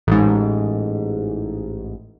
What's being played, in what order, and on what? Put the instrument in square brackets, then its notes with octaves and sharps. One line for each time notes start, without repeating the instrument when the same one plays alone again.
[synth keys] A1 G#2